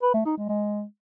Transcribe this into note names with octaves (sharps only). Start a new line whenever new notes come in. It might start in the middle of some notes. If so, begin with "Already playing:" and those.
B4
A3
D#4
G#3
G#3